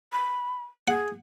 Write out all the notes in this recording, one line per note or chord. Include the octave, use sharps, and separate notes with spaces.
B5
G#4 F#5